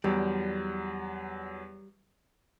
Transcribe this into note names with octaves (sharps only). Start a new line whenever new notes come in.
E2 F#3 G3